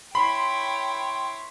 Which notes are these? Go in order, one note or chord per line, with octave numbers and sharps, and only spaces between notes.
E4 C#5 G5 B5 C6